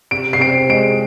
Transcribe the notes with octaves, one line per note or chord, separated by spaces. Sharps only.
C3 D7
C7
C4 D7
G#3 D7